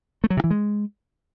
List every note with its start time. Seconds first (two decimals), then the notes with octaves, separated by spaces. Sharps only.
0.24 A3
0.30 F#3
0.37 C3
0.44 E3
0.51 G#3